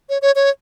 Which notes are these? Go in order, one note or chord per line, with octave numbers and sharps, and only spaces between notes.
C#5
C#5
C#5